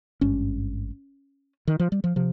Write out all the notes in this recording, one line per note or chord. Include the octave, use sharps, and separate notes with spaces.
G#1 G2 C#4
D#3
F3
G3
F3
C3 F3